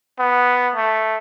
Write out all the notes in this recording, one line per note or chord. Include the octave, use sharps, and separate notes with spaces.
B3
A3